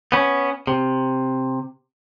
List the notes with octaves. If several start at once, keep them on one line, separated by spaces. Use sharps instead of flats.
B3 C#4
C3